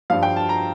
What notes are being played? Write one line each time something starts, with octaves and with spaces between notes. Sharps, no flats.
G2 F3 F5
G5
A5
A#5